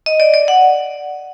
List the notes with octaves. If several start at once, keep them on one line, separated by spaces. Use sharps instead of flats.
D#5
D5
D5
F#5